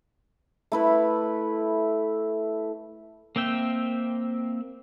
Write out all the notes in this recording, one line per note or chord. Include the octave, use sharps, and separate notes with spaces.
A3 E4 B4
A#3 C4 E5 G5